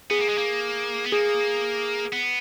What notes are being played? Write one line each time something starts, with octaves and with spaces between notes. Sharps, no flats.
B3 G#4
A#3
G#3
A#3
B3
A#3 G#4
B3